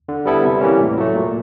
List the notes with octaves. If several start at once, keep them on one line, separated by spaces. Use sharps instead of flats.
D3
G3 B3 E4 A4
C3
E3 G3 A#3 C#4
A2
F#3 A3
A#2